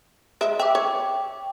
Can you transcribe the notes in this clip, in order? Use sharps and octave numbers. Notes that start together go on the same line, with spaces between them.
G#3 E5
E5 G5 D6
C#5